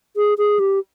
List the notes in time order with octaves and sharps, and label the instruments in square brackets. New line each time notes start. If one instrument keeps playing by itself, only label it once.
[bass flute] G#4
G#4
G4